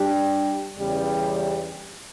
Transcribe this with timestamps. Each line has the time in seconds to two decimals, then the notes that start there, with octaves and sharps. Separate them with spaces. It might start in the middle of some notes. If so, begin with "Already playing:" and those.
Already playing: G3 D4 G4
0.78 E2 C#3 G3